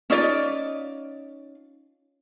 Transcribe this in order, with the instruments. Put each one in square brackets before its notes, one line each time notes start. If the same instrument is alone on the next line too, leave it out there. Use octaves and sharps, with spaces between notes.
[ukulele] C#4 D#4 F4 D5